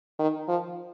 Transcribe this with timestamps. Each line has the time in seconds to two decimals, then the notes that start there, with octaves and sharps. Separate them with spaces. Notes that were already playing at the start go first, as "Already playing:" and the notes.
0.19 D#3
0.48 F3